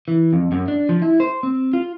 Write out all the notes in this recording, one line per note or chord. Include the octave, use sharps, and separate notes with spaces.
E3
F2
F#2
D4
F3
E4
C5
C4
F4